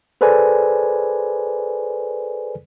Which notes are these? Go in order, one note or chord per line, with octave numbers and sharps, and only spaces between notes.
G#4 A4 B4 C5 D5 G#5